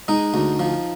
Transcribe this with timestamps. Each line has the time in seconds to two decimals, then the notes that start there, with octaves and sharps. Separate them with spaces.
0.08 G#3 D#4
0.34 D2
0.59 F3